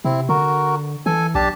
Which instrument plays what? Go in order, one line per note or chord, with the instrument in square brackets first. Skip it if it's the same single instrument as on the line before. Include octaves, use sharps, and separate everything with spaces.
[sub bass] C3 [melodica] C4 E4
[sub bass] D3 [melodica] F#4 A#4
[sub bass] E3 [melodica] A4 G#5
[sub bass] B1 [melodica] D4 G4 A5